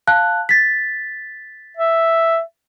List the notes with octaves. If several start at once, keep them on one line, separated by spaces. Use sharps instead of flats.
F5 A5 F#6
A6 B6
E5